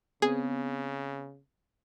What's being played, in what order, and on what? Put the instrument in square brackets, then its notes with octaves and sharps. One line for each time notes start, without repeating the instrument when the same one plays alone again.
[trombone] C#3 [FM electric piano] B3 C4 [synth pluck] G#4